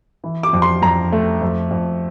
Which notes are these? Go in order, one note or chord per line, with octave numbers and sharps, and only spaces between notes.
E3
D6
F2
C6
F2 A#5
A3
F2
F2